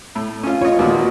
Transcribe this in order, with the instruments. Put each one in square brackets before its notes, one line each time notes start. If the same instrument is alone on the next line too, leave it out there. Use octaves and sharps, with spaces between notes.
[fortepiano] A2
C#4 F4
[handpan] F4 [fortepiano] C#5 D#5
[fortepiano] D#2 A#2 [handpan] F#4 B4 D#5